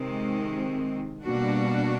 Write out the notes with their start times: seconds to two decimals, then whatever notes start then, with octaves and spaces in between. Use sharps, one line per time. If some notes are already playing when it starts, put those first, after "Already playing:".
Already playing: C3 D#3 G#3 C4
1.24 B2 G3 A#3 D4 F#4